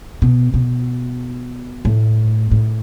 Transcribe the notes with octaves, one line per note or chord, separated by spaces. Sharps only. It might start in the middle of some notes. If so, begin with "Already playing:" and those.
B2
B2
A2
A2